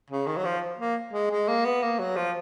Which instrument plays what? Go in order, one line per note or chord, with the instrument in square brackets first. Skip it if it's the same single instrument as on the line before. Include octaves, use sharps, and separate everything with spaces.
[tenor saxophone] C#3
D#3
F#3
F3
A#3
G#3
G#3
A#3
B3
A#3
F#3
F3